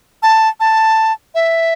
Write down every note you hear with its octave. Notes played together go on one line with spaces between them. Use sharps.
A5
A5
E5